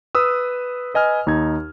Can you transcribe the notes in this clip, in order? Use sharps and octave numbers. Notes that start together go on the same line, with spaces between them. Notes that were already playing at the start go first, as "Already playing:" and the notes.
B4 D#6 E6
B4 D#5 G#5 F6
D#2 D#4 G#6